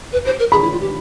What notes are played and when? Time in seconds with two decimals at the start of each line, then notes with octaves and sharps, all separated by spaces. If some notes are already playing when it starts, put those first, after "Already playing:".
0.12 B4
0.26 C5
0.39 A#4
0.52 G#4 B5
0.62 E4
0.72 F4
0.81 G4